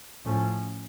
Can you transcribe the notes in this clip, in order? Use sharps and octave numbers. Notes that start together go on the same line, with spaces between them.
A2 F3 A3 C#4